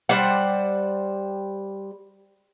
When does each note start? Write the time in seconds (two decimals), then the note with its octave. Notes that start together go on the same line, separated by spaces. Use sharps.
0.09 G3 C5 D5 F#5